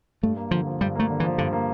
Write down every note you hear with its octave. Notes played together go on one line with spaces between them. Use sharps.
G2 A3
A#3
D3 F3
F3
G2 G3
A3 A#3
D3
E3
F3
G2 D3
A#3